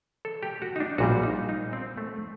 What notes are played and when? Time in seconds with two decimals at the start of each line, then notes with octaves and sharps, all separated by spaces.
0.25 A4
0.43 G4
0.62 F#4
0.76 D#4
0.80 D4
0.98 A#1 A#2 G3 F#4
1.23 D#4
1.49 D#4
1.73 C4
1.97 A3